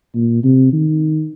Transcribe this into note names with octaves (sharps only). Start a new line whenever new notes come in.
A#2
C3
D#3